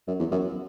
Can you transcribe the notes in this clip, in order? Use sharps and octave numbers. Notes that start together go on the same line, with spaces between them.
F#2
E2
F#2